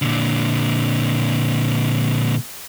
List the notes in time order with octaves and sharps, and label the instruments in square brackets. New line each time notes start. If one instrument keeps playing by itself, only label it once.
[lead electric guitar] A#2 D3